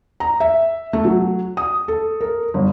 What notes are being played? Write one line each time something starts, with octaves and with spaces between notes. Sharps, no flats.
A#5
E5
A3
F#3
D#6
A4
A#4
G1